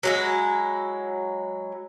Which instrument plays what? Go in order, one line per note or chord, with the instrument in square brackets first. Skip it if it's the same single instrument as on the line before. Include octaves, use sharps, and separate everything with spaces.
[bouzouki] F#3 G#3 E4